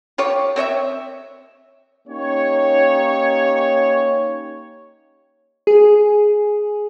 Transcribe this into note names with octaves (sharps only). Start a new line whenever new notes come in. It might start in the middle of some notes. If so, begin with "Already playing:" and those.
F4 G4 C#5
C4 C#5 D#5 E5
A#3 C#4 D#4 G4 C#5
G#4